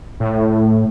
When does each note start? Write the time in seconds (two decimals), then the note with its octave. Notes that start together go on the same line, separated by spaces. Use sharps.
0.20 A2